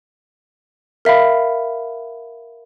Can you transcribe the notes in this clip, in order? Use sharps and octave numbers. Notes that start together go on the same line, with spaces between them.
A#4 E5 F5 B5